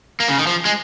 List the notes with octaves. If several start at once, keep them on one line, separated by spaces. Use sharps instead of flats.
A#3
C#3
D#3
F3
G#3